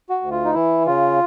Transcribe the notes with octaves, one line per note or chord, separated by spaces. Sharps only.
F#4
D2
F4
D#4
E3 E4
C#3 F4